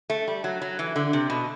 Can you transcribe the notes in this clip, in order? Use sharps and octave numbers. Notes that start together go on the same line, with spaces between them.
A3
G3
F#3
F#3
E3
D3
C3
B2